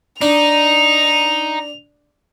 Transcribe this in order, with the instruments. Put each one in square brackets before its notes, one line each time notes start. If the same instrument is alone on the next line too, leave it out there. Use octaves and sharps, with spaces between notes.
[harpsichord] D4 [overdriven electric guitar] D#4 [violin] F7